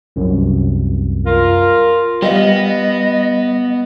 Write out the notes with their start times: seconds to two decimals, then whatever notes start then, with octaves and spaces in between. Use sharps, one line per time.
0.16 C2 F#2
1.26 F4 A#4
2.22 G3 B3 D#5 F5